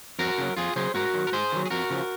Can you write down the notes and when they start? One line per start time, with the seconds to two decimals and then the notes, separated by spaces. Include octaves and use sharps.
0.19 F2 F#4 A#4
0.38 C#3 F#3
0.57 F2 F4 G#4
0.76 C#3 F#3 G#4 C5
0.95 G#2 F#4 A#4
1.14 D#3 F#3
1.27 A#4
1.32 G#2 G#4 C5
1.52 D#3 F#3
1.66 G#4
1.70 F2 F#4 A#4
1.90 C#3 F3